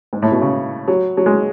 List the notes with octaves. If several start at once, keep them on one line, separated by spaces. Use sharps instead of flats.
G#2
A2
B2
C#3
F#3
F#3
G#3